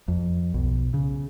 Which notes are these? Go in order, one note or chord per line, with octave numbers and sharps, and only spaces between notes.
F2
B1
C#3